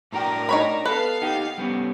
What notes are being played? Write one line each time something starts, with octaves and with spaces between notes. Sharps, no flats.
A2 D4 F#4 A#4 G5
D#4 C#5 B5
B3 A4 B4 F5 C7
D#4 G4
G3 B3 C#4